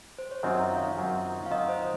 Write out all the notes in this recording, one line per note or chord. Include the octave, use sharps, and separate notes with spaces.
C5
C#5
F#2 D#3 F#3 C4 F4 D#5
F5
F#2 D#3 F#3 C4 F4
F5
F#2 D#3 F#3 C4 F4 D#5
C5